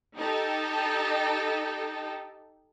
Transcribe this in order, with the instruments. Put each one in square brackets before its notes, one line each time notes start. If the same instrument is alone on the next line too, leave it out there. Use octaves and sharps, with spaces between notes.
[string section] D#4 G4 A4